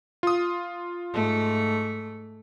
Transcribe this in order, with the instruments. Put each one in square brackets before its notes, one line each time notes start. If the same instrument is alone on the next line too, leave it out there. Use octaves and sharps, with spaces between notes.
[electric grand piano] F4 D#6
[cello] G#2 A3